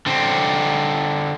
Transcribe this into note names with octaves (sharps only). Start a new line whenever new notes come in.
D3 C4